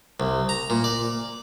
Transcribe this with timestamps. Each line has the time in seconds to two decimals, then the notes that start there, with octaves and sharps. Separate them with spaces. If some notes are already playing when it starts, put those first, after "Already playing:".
0.20 C2
0.49 A#5
0.70 A#2
0.84 D5